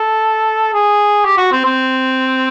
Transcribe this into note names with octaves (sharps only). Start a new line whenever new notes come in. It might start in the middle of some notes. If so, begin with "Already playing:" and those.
Already playing: A4
G#4
G4
F#4
C4
C4